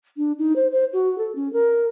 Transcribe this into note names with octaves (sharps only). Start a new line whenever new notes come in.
D4
D#4
C5
C5
F#4
A4
C#4
A#4